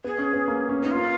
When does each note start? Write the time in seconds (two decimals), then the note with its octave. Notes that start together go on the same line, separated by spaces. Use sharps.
0.04 B3 G#4
0.18 C#4
0.33 B3
0.48 A#3
0.69 C#4
0.83 B3 D#4
0.91 F4
0.97 A#3